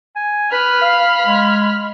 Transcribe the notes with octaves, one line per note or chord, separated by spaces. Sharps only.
G#5
B4 B5 F6
F5
G#3